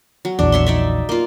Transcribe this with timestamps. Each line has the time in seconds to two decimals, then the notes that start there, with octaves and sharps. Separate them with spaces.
0.25 F#3
0.39 A#1 E2 D4
0.52 C#5 E5 C6
0.66 D#4 D5 E5
1.09 A#3 F4